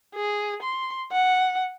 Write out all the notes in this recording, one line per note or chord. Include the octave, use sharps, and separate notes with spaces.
G#4
C6
F#5